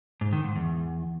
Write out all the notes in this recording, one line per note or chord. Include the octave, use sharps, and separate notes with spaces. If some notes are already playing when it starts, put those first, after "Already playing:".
G#2
D#3
G#2
E2